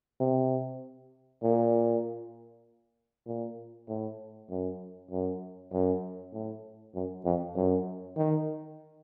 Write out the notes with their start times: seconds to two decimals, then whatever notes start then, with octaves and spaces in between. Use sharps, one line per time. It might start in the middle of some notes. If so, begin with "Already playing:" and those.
0.20 C3
1.43 A#2
3.27 A#2
3.88 A2
4.50 F#2
5.11 F#2
5.73 F#2
6.33 A2
6.95 F#2
7.25 F2
7.56 F#2
8.17 D#3